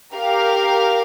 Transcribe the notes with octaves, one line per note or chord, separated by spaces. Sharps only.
G4 A#4 F5